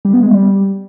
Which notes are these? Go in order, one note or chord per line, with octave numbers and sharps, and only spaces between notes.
G3
B3
G#3
G3